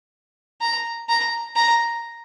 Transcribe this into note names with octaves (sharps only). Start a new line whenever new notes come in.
A#5
A#5
A#5